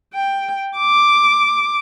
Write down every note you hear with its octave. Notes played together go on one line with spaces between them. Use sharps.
G5
D6